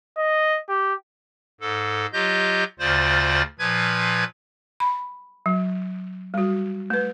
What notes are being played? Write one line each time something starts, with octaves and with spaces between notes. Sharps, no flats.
D#5
G4
G#2 A4
F#3 F4 G4 D#5 G6
D2 C#3 F4 C5 D5 A6
A#2 F3 B4 G#6
B5
F#3
G3 F#4
A3 B4